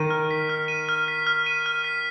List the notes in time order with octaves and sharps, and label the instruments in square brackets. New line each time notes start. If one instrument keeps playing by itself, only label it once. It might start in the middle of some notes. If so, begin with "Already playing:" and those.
Already playing: [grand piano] D#3 [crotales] D#7
[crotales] F6
B6
F6
D#7
F6
B6
F6
D#7
F6
B6